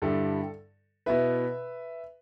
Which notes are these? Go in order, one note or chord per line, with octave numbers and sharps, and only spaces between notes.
G2 D3 G3 E4 A4
B2 B3 E4 B4 E5